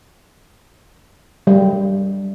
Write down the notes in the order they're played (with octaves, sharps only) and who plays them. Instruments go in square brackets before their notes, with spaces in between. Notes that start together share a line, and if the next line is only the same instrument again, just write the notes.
[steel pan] G3